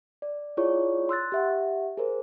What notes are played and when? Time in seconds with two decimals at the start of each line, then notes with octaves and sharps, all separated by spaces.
0.22 D5
0.57 E4 F4 G#4 C#5 D5 C#6
1.09 C6 E6 F#6 A6
1.32 G4 E5 F#5
1.97 G#4 A#4 C5